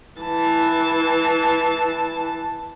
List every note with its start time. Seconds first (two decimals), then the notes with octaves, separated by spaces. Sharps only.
0.21 E3 A5